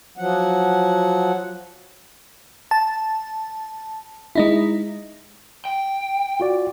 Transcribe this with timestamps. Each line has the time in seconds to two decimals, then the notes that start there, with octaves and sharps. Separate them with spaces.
0.18 F3 F#3 F#5
2.71 A5
4.35 G#3 D#4 E4
5.65 G5
6.40 F4 F#4 D5